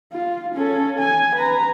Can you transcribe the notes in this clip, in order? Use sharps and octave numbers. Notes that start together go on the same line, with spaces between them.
F4
C#4 A4
G#5
B4 A#5